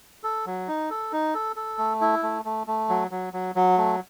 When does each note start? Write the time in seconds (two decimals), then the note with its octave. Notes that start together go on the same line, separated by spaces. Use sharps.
0.24 A4
0.46 F#3
0.68 D#4
0.90 A4
1.12 D#4
1.34 A4
1.56 A4
1.78 A3
2.01 E4
2.23 A3
2.45 A3
2.67 A3
2.89 F#3
3.11 F#3
3.33 F#3
3.55 F#3
3.78 A3